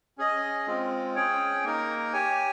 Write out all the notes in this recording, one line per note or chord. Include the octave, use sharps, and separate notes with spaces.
C#4 G#4 D#5
G#3 C4 F4
C#4 G#4 C#5 G5
A#3 D#4 A#4
G4 C#5 G#5